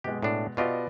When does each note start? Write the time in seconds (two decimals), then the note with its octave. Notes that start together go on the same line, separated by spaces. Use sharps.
0.04 B2 G#3 G4
0.22 A2 D4
0.57 B2 B3 F4 G4 D5 D#5